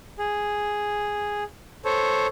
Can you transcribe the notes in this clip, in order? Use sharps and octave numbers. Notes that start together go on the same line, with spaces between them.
G#4
A4 C5 C#5